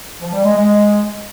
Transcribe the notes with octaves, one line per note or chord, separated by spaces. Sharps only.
F3
G3
G#3
G#3